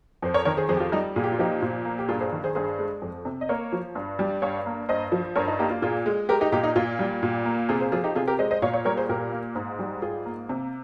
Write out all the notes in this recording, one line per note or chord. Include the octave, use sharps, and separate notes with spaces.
F2 C5
A#4 C#5
D#3 A#4 C#5
G#4 C5
F2 G#4 C5
G4
F4
G3 D#4
A#2 G#4
G4
F4
F3 D#4 G4
A#2
A#3
G4
G2 F4 G#4
G#4 C5
D#3
G#4 C5
G2 G#4 C5
G#3
F2
C3
D#5
A#3 A#4 C#5
F3
G2
G3
G2 C#5 F5
A#3
G2 C5 D#5
F3
G2 A#4 C#5
D#4
A#3 D#4 G4
F4
A#2 F4 G#4
G#3
G#3 G4 A#4
D#4 G4
A#2 D#4 G4
D#4
A#2 F4
G3
A#2
A#3
C3 F4 G#4
G#4 C5
F3 F4 G#4
D#4 G4
C3 F4 G#4
G4 A#4
G#3 C5 D#5
C5 D#5
A#2 C#5 F5
C#5 F5
G3 A#4 C#5
G#4 C5
A#2 G4 A#4
A#3
G#2
G3
G#2 F4 G#4
A#3
C3